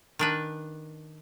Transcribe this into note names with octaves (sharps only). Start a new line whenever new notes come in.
D#3 D4 B4